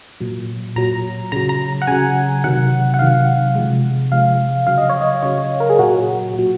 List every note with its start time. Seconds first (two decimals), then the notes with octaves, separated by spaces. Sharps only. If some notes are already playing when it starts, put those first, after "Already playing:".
0.20 A#2 F#3
0.76 A#2 F#3 A#5
1.32 C#3 F#3 A#5
1.49 A#5
1.82 F#5
1.87 C#3 F#3 G#5
2.44 C3 D#3 F#3 F#5
2.94 F#5
2.99 C3 D#3 F#3 F5
3.55 C3 F3 G#3
4.11 C3 F3 G#3 F5
4.67 C#3 F#3 F5
4.78 D#5
4.89 C#5
5.01 D#5
5.23 C#3 F#3 C#5
5.60 A#4
5.70 G#4
5.79 A#2 F#3 F#4
6.34 A#2 F#3